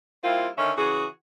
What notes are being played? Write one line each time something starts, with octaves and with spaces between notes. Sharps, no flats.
G3 A#3 C4 E4 F4
D3 D#3 C#4 E5
C#3 E3 F#4 G#4